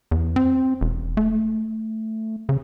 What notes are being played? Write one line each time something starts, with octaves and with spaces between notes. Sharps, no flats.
E2
C4
E1
A3
C#3